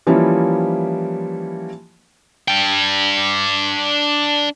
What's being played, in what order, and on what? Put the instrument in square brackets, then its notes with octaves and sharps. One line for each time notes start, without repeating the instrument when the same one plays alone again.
[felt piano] E3 F3 G3 A#3 C#4 E4
[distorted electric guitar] D4 G5